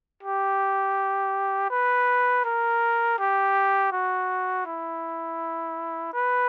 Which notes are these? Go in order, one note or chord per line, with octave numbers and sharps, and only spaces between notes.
G4
B4
A#4
G4
F#4
E4
B4